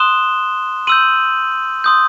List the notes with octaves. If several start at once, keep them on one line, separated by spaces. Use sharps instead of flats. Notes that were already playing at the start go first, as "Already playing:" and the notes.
Already playing: C6 D#6 F#6 E7 G7
C6 E6 G6 D#7 F#7
C6 D#6 G6